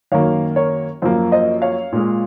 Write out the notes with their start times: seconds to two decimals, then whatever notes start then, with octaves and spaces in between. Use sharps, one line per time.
0.12 F#2 D#3 F#3 A#3 C#5 F5
0.56 A#4 C#5
1.02 F#2 F3 A#3 C5
1.32 C5 D#5
1.62 C#5 F5
1.92 A#2 G#3